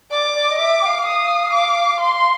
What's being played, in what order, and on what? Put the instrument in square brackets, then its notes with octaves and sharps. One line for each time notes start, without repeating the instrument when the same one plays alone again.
[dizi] D5 [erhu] D6
[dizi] D5
D#5
[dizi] E5 [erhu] D6
[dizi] G5
F5
[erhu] D#6
D6
C6